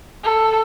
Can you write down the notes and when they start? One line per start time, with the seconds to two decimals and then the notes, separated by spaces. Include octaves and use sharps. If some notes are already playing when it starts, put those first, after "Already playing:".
0.24 A4